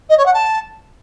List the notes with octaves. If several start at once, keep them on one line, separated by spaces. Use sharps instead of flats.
D#5
C#5
F#5
A5